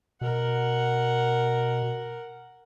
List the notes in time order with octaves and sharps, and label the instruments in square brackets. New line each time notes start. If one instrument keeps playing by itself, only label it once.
[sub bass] B2 [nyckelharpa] A#4 F#5